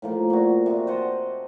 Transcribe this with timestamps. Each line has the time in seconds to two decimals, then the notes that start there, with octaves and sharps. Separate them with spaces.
0.02 A2 F3 A#3
0.30 A#2 F#4
0.66 C3 D5
0.87 C5 D#5 F#5 A5